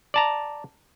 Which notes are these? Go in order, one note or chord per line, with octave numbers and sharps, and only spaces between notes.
D5 A5 A#5